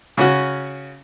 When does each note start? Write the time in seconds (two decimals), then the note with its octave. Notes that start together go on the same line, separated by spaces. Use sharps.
0.17 C#3 C#4 F#4